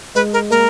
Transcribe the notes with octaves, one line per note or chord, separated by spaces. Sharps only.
G#3 B4
A#4
A#3 A#4